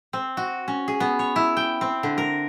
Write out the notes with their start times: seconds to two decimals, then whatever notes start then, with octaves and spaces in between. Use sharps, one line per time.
0.13 C4
0.37 F#4
0.68 C#4
0.88 G#4
1.00 B3
1.19 C#5
1.36 E4
1.57 G5
1.81 C4
2.03 D3
2.18 A#4